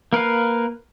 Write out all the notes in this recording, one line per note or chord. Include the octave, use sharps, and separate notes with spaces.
A#3 A#4 B4 F5